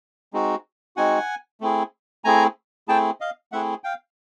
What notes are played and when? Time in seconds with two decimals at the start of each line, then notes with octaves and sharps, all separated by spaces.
0.33 G#3 C4 D#4 F#4
0.96 G#3 C4 D#4 F#4 F#5 G#5
1.61 A3 C4 E4 G#4
2.24 A3 C4 E4 G#4 G#5 A#5
2.88 A3 C4 E4 G#4 G5 A5
3.20 D#5 F5
3.52 A3 C4 E4 G#4 E5 F#5
3.84 F5 G5